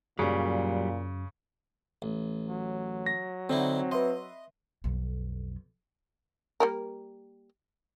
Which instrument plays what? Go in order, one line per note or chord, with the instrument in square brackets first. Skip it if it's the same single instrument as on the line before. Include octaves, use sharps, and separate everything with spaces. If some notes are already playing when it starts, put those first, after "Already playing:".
[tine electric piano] F#2 [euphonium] A#2 [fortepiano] C#3 [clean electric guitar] F#3 G3
[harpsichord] A1
[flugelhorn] F#3
[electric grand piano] A#6
[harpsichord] D3 D#4 E4 [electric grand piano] C4
[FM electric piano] B4 E5 C6 [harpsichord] D#5
[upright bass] B1 F2
[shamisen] G3 A#3 A#4